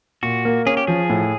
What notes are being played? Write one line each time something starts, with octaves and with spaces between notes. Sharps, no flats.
A#2 F#4
A#3
C#4 G#4
G4
F3 G#4
A2